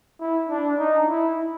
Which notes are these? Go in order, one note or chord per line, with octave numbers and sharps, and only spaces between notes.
E4
D4
D#4
E4